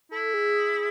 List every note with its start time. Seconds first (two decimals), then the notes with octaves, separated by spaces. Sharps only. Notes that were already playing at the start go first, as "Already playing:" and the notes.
0.11 E4 A4
0.34 G#4